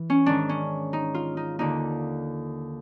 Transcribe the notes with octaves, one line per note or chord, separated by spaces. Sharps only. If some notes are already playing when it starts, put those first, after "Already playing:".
Already playing: E3
C#4
G#2 D#3 D4
C#4
D#4
F4
D#4
D#2 D3 D#4